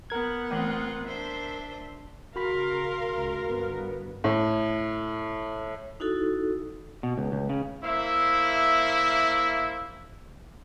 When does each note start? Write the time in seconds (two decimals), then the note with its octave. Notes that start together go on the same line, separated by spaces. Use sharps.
0.10 B3 A#4 F#5 G#6
0.51 E3 A3 C4 F4
1.07 D4 C5 E5
2.36 C#3 F#4 A#4 F5 B5 C6 B6
3.12 C#2
3.46 G1 G2 B3
4.24 A2
6.00 D#4 E4 F#4 A4
7.03 B2
7.18 C#2
7.32 C#2
7.49 C#3
7.83 A#3 E4 C5 E5